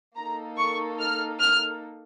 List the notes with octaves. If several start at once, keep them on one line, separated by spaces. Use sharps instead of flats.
A#3 D#4 A4 A#5
C#6
F6
F6